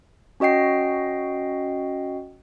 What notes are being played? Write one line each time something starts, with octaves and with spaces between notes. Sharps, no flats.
C#4 F#4 D#5 G5 C7